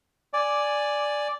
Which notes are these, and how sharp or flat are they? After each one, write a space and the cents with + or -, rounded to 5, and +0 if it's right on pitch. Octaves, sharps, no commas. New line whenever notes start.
D5 +0 G#5 +0